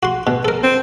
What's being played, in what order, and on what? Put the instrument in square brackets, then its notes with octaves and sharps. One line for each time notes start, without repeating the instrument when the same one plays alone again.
[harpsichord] F#4 C6
B2
A4 A#4
[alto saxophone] C4